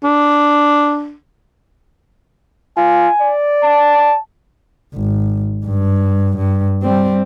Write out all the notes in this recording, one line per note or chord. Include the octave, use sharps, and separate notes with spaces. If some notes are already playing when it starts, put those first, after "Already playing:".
D4
F4 G#5
D5
A5
G#1
G2
G2
G3 C4